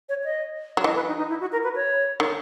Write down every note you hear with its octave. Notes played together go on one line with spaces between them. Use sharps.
C#5
D#5
F#3
E3 D#5
B4
D#4
D#4
E4
F#4
A#4
B4
C#5
D#3